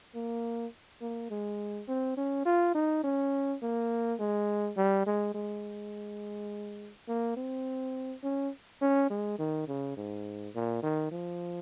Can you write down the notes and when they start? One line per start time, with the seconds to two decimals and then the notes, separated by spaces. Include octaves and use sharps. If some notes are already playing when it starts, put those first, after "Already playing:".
0.15 A#3
1.01 A#3
1.30 G#3
1.88 C4
2.17 C#4
2.45 F4
2.75 D#4
3.03 C#4
3.62 A#3
4.19 G#3
4.77 G3
5.06 G#3
5.35 G#3
7.08 A#3
7.37 C4
8.23 C#4
8.81 C#4
9.10 G#3
9.39 D#3
9.68 C#3
9.97 G#2
10.55 A#2
10.83 D#3
11.12 F3